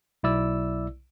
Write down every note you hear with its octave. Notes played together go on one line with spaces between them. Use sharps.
B1 E4 D5 E6